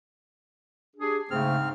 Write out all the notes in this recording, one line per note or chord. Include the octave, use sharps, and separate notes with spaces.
D4 G4 G#4
G#2 C#3 A3 C4 F6